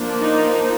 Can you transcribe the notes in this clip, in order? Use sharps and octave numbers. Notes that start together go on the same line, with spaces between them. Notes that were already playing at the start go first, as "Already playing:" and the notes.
Already playing: F3 A#3 D4
D#4